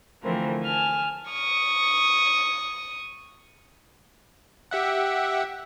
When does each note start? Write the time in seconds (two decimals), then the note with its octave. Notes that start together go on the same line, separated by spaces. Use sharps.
0.22 D3 E3 F3 A3 C4 A#4
0.62 G#5 A5 F6
1.30 C#6 D#6
4.71 G4 E5 F#5